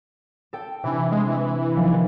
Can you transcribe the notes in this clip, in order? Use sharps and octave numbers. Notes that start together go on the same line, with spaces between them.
A4 G5
C3 E3 D4
G#3
E3
D#2 F3